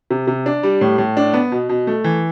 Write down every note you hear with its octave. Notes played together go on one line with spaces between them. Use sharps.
C3
C3
D4
G3
A2
A2
D4
B3
B2
B2
A3
E3